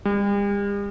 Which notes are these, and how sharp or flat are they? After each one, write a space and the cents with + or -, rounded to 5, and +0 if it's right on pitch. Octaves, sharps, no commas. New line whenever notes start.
G3 +45